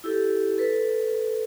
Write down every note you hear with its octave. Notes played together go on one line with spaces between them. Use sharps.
E4 G4 A4
A4 B4